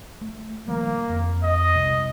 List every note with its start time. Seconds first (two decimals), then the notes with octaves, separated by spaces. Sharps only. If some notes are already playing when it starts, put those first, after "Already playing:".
0.21 A3
0.68 D#3 F3 G3 A#3
1.09 F2
1.43 D#5
1.74 B1 C3